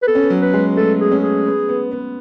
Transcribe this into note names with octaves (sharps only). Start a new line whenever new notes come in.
B4
B3 A4
C#4
B3
F#3
B4
G#3
A3 A4
G#4
C#4
G#4
B3
B3
B3